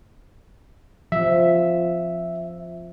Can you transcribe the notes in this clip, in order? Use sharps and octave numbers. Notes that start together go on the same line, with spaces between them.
F3 E5